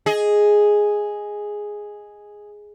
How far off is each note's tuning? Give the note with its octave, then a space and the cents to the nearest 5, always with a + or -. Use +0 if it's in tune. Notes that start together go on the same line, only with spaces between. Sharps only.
G#4 +0 D#5 +5